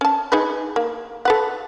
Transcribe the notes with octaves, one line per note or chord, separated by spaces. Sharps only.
C#4 A5
D#4 G#4 B4
A#3
A4 B4 F#5